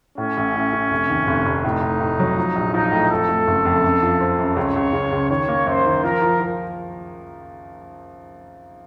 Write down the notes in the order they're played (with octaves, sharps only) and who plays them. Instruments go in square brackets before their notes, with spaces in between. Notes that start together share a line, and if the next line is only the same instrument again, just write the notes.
[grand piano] A2 [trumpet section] C#4
[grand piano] A1
A2
A3
F1
D#2
F1
F1
[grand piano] A2 [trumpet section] D#4
[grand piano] A2
A2
F#3
F3
A#1
[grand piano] F3 [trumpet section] D#4
[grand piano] A2
[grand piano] F2 [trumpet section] A4
[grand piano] A3
F#1
F2
F#2
F3
C4
F#2
[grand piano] C#2 [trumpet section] C#5
[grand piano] C#2
C#3
C#2
[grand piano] D#3 [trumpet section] C#5
[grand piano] A#3
[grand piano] F#2 [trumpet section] C5
[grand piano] D#3
[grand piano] F3 [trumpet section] A#4
[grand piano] F3
F3